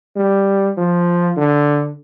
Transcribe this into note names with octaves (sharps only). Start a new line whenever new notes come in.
G3
F3
D3